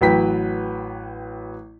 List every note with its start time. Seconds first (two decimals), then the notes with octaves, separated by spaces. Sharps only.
0.01 A1 F#3 B4 G5 B6